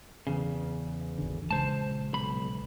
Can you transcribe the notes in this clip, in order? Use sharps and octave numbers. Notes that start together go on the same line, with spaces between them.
E2 C#3
G#1 D3
A#1 C#3 G#3 C5 A5
B1 B5